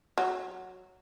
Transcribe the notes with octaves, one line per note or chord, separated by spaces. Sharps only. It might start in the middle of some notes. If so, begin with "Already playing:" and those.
F#3